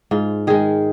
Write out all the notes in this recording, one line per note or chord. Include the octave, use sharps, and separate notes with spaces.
G#2 F4
D#3 G#3 G#4